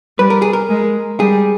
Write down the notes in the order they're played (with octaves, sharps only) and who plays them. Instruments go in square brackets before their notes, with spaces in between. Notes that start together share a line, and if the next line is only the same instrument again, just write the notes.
[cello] G3 [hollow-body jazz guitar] B4
[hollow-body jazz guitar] A#4
G#4
A#4
[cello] G#3
[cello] G3 [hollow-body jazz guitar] G#4